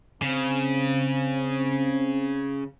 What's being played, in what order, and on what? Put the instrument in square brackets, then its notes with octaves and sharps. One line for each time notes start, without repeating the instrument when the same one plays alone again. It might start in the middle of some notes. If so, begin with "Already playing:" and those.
[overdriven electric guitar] C#3 [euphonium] C4